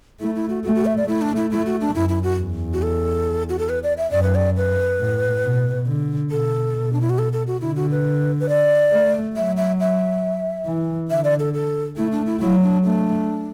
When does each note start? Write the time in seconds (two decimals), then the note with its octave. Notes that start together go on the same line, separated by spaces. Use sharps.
0.21 A3 E4
0.36 E4
0.49 F#4
0.64 A3 F#4
0.75 F#4
0.86 E5
0.97 D5
1.07 A3 E4
1.22 D4
1.36 E4
1.52 A3 E4
1.66 F#4
1.81 D4
1.94 F#2 E4
2.09 E4
2.23 F#4
2.39 E2
2.74 F#4
2.82 A4
3.49 F#4
3.59 A4
3.69 B4
3.83 D5
3.98 E5
4.11 F#2 D5
4.23 B4
4.35 D5
4.57 B4
4.99 A2
5.44 B2
5.87 D3
6.30 B2 A4
6.74 B2
6.93 D4
7.01 E4
7.10 F#4
7.18 A4
7.33 A4
7.47 F#4
7.61 D3 E4
7.76 F#4
7.91 B4
8.40 B4
8.49 D5
8.92 A3
9.35 F#3 E5
9.57 E5
9.80 E5
10.66 E3
11.11 D3 E5
11.24 D5
11.39 A4
11.54 A4
11.97 A3 E4
12.12 D4
12.26 E4
12.40 F#3 E4
12.63 D4
12.84 A3 D4